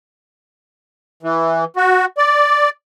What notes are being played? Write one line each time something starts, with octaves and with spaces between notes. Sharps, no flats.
E3
F#4
D5